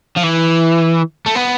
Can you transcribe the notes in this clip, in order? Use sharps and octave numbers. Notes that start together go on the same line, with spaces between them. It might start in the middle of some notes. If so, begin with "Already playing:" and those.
F3
E3
A3
B3